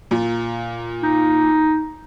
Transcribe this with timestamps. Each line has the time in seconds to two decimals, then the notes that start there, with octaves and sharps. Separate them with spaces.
0.11 A#2
1.03 D#4